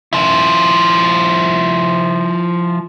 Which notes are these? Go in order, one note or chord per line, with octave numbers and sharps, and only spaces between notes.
F3 E4